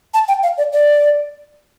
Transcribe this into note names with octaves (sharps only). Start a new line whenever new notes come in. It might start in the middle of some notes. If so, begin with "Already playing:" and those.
A5
G5
F5
D5
D5